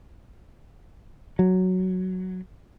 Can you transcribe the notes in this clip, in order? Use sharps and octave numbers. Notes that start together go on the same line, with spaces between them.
F#3